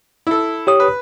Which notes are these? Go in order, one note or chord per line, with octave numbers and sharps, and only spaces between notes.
E4 A4
G4 C#5 D#6
B4